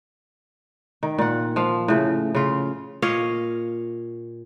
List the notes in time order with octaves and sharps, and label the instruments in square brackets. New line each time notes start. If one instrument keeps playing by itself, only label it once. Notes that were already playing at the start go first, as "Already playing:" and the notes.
[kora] D#3
A#2 F#5
F3 F5
A2 C#3
C#3 F4
A#2 C#5 D#5 F5